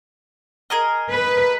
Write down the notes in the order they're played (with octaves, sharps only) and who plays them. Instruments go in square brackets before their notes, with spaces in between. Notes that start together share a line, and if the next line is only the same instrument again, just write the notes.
[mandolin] G#4 A#4 D#5
[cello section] B4